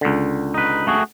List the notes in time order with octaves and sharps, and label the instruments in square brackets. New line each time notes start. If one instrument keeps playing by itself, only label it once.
[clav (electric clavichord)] C#2 D3
[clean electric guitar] D#4 B4
A3 F#4 G#4